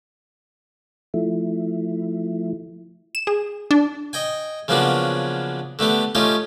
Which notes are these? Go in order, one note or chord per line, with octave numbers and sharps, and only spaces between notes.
F3 A3 E4
E7
G#4
D4
D#5 G5 G#5
C#3 F3 F#3 A#3 B3 D4
D3 A3 B3 G4
A3 C#4 D#4 F4 G4